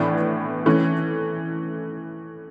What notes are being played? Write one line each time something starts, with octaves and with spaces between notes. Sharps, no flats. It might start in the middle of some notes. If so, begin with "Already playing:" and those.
Already playing: A2 E3 B3 D4
E3 A3 C#4